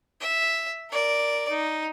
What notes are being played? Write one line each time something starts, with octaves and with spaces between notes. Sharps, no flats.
E5
A#4 D5
D#4